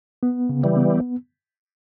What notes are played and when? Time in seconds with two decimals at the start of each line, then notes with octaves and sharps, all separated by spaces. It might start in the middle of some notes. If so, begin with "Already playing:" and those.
0.23 B3
0.49 C#3
0.63 E3 G3
0.77 B3